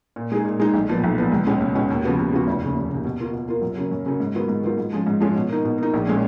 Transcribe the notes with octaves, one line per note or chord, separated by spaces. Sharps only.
A#2
G#3 D#4 G#4
A#2
G#3 D#4 G#4
B1
A#2 F3 B3
B1
A#2 F3 B3
C#2
B2 G#3 C#4
C#2
B2 G#3 C#4
D#2
C#3 F3 B3 F#4
D#2
C#3 F3 B3 F#4
F1
D#2 C#3
F1
D#2 C#3
B2
A#3 F4 A#4
B2
A#3 F4 A#4
F#2
C#3 F#3 A#3 C#4
F#2
C#3 F#3 A#3 C#4
G#2
D#3 F#3 B3 F4
G#2
D#3 F#3 B3 F4
G#2
F3 G#3 C#4
G#2
F3 G#3 C#4
B2
A#3 D#4
B2
A#3 D#4
A#1
A#2 G#3 C#4